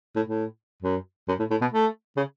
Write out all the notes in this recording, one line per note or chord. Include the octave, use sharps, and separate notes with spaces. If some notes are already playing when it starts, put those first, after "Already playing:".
A2
A2
F#2
F#2
A2
A2
B2
A3
C#3